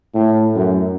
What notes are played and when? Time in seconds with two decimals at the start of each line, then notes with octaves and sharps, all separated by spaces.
0.15 A2
0.56 F#2